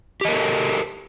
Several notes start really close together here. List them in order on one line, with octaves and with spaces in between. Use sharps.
G4 D#5 A#4 A4